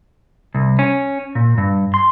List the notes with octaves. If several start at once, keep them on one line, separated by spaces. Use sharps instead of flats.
C2
C#4
A#2
G2
C6